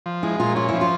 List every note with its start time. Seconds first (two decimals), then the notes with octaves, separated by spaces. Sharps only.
0.06 F3
0.23 G#3 E4
0.40 A#2 F4
0.56 C#4 F4
0.68 F3 E4
0.81 F4